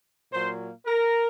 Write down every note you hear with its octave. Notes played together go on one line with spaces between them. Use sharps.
A#2 F#3 A#3 C5
A#4